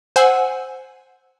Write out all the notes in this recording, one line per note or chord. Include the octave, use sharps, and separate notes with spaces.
C5 F#5 G#5 E6